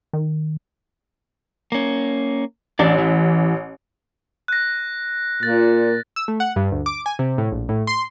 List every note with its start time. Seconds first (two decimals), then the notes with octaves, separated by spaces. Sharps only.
0.13 D#3
1.72 A#3 C#4
2.79 A1 D4 D5
2.98 E3
4.48 F#6 A#6
5.43 A#2 A6
6.16 E6
6.28 A3
6.40 F#5
6.56 G2
6.72 D2
6.86 D6
7.06 G#5
7.19 C3
7.38 A2
7.52 A#1
7.69 A2
7.87 C6